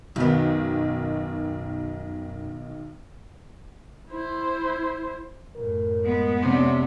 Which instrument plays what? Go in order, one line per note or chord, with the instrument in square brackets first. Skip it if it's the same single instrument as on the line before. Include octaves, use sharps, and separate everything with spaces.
[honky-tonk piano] B1 D#3 [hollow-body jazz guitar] F#2 B3
[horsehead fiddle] E4 C5
[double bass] F#2 A2 [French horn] A#4
[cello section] G#3 B3
[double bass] F2 D4 [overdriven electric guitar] C3 [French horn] C#4